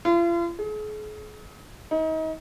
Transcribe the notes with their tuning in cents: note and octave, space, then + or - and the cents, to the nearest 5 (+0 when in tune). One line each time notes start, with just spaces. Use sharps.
F4 -40
G#4 +40
D#4 +35